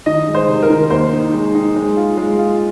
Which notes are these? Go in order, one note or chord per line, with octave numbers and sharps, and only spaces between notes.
D#3 D#5
G#3
C5
C3
A#4
D#3
D#2 C5
D#4
G#3
D#4
G#3
F4
G#3
F4